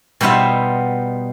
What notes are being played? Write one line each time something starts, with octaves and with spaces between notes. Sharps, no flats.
B2 G3 B3 D#4 F4 E5